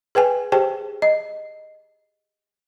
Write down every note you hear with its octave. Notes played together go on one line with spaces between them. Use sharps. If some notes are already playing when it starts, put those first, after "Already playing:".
G#4 B4 G5 G#5
G4 G#4 C5 G5 A5
D#5